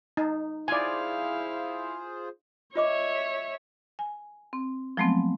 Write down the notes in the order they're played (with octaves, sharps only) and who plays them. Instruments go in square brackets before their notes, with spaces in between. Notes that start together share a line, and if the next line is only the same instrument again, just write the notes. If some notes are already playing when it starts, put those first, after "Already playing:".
[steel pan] D#4
[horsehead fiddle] E4 F5 [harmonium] F4 G#4 C5 [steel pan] D5 G#5
[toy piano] F4 D#5 D6 [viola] C#5 E5
[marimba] G#5
C4
F3 F#3 G#3 A3 B3 C4